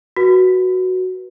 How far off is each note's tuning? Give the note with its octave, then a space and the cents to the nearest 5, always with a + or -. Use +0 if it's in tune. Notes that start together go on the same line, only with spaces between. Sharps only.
F#4 +0 B4 -25